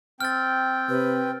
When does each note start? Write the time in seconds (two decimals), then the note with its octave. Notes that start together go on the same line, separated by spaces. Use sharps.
0.20 C4 G5 F6 A6
0.89 C3 B4